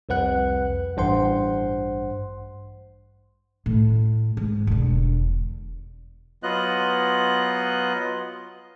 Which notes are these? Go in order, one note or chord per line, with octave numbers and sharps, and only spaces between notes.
C2 F2 B4 F#5 F#6
A1 G2 C5 F#5 C6
A2
G#2
E1 D3
F#3 B3 F4 D#5 F#6